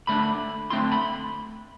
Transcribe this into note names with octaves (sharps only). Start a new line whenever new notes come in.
D3 A3 D4 B5
D3 A3 C4 E4 C6
B5